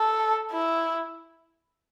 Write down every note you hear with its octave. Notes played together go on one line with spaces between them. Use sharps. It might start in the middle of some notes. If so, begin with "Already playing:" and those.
Already playing: A4
E4